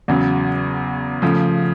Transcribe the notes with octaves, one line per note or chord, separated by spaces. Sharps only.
E2 C#3 F#3
C#3 F3 A3